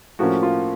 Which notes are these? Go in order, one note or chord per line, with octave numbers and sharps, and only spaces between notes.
A2 F3 A#3 C#4 F#4
F4